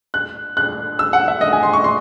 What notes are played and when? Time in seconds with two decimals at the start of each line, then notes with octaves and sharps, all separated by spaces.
0.14 F#6
0.57 F#6
0.99 E6
1.13 F#5
1.28 E5
1.41 D#5
1.52 G#5
1.63 C6
1.73 C#6
1.84 C6